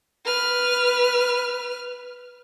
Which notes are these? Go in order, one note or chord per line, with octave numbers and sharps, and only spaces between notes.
B4 F6